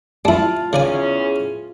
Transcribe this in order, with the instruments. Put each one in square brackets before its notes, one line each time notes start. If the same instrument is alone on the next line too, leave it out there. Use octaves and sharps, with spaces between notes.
[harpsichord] G3 E4 [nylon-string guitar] F4 A5
[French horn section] E2 C#4 G#4 [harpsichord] C#3 D4 G#5